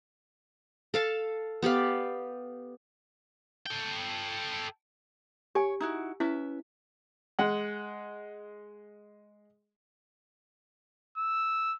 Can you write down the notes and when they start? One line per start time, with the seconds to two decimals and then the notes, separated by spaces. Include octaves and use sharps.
0.94 A4 F5 A5
1.62 B3 G4 D5 F5
3.66 A4 G5
5.55 G4 C#5 G#5
5.80 D#4 E4 F#4
6.20 C#4 E4 B4 E5
7.39 G#3 F#5
11.18 E6